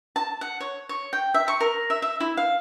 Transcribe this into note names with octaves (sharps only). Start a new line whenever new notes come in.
A5
F#5
C#5
C#5
G5
E5
C#6
A#4
E5
E5
E4
F5